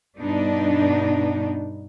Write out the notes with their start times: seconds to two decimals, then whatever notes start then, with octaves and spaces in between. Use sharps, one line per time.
0.18 G2 B2 B3 D4 D#4